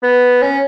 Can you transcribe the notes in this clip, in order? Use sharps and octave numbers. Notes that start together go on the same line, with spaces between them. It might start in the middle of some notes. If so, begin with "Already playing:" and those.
B3
C#4